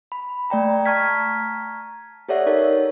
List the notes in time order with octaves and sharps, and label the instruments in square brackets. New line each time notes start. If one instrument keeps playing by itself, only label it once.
[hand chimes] B5
A3 D5 G5 A#5
A5 A#5 C#6 F6 G#6 B6
G4 A4 C#5 D5 E5 F#5
D#4 A#4 C#5